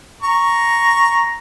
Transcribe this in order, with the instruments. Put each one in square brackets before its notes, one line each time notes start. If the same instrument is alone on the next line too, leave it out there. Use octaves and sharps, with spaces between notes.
[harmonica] A#5 C#6